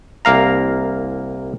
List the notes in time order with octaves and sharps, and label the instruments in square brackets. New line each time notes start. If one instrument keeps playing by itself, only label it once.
[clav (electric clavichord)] C2 A#3 F5 A#5